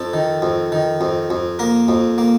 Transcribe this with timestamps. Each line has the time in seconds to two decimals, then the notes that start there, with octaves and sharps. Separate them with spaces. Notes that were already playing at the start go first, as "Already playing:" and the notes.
Already playing: F2 A4
0.14 D#3
0.42 F2
0.72 D#3
1.01 F2
1.30 F2
1.59 A#3 A#4
1.88 F2
2.18 A#3